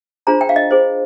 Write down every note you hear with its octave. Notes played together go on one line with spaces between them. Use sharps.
D4 F4 G#4 C5 A#5
G5
F5
D#5
F4 G#4 C5